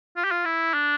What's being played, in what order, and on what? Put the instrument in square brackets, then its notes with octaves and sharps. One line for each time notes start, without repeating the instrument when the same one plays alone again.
[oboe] F4
G4
F4
E4
D4